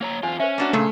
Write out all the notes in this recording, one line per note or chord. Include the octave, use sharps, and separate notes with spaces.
A#3 C#5 A#5
E2 F4 C5 D5 G#5
C#4 B4 C5 E5
A#3 D4 F#4
A#2 C#3 A3